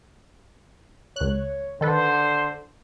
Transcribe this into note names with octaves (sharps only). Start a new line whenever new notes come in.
C#2 C#5 F#6
D3 D#3 A4 B4 C5